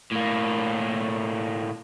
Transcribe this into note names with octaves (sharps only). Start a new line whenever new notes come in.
A2 A#3